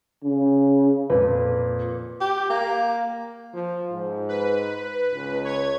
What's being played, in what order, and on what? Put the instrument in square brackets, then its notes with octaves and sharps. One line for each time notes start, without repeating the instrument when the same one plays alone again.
[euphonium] C#3
[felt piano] F2 A#2 [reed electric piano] B4
[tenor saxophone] G4
A#3
[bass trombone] F3
G#2
[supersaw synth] B4
[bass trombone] C#2
[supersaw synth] C#5 G#6